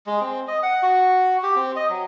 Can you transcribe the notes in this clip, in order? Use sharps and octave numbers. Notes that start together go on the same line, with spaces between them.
G#3
C4
D#5
F#5
F#4
G4
C4
D#5
F#3